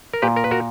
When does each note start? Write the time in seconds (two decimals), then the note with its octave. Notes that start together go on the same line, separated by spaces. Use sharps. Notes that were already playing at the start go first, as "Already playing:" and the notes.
0.14 A#4
0.22 A#2 G4 B4
0.36 A#4
0.44 B4
0.51 F#4 A#4